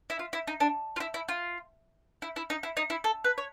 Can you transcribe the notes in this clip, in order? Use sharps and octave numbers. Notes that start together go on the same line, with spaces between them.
E4
F4
E4
D#4
D4
F4
E4
E4
F4
E4
E4
D#4
E4
D#4
E4
A4
B4
C#5